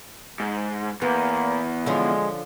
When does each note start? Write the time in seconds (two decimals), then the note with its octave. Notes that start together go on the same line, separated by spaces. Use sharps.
0.40 G#2
1.02 E2 A#3 B3
1.86 D3 F3 G#3 C#4